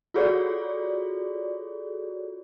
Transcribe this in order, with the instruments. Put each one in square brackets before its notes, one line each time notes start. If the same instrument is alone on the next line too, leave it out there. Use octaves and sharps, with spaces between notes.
[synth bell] F4 F#4 G#4 A4 C#5 D5